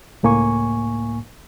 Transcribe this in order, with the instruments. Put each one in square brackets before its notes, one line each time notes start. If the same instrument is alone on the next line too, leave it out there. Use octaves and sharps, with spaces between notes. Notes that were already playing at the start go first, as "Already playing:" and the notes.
[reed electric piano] C#2 A2 A#3 G#5 C#6